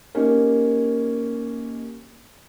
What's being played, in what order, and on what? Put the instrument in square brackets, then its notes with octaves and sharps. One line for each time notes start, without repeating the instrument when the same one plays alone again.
[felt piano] A#3 C#4 D#4 G4